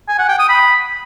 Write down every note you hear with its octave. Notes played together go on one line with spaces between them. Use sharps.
G#5
F#5
G5
D#6
B5